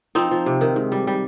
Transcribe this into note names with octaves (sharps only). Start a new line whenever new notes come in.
F3 C4 D#4
F3
C3
D#3
G#2
G3
G3